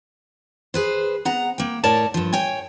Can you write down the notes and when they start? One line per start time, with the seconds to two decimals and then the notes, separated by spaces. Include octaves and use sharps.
0.74 G#4 B4 C5
1.25 B3 F#5 A#5
1.58 A#3 G5
1.84 A2 A#4 C#5 D5 A5
2.14 G2 F3
2.33 C#5 G5 G#5